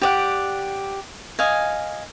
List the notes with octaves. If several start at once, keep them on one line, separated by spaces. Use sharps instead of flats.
G4 D5 F#5
D#5 F5 G#5